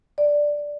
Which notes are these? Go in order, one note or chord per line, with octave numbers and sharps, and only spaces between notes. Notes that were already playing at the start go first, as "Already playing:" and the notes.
D5